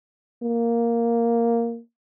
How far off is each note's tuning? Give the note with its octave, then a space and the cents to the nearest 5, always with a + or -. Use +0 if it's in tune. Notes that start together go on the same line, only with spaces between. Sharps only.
A#3 +0